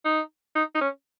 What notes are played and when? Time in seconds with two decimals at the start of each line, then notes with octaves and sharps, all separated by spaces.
0.05 D#4
0.55 D#4
0.75 D#4
0.81 C#4